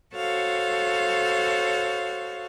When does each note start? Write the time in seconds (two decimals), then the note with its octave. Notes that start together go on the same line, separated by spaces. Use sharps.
0.15 F#4 A4 C5 C#5 F5